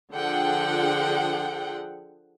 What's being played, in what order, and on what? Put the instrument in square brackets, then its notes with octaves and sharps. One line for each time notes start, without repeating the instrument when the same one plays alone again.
[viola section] D3 F3 G#4 F#5 G5